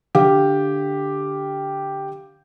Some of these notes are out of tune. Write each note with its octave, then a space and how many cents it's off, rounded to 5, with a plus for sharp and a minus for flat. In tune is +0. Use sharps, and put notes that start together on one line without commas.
D3 -5 G4 +0 F5 +0